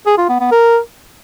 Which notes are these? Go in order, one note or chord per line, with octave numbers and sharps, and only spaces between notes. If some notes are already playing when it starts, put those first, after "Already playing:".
G#4
F4
B3
B3
A#4